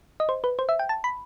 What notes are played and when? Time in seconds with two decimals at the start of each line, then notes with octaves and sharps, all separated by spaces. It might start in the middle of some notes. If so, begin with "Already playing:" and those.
0.20 D#5
0.29 C5
0.44 B4
0.59 C5
0.69 E5
0.79 G5
0.89 A5
1.04 B5